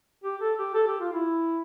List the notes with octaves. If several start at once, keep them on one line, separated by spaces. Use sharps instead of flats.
G4
A4
G4
A4
G4
F4
E4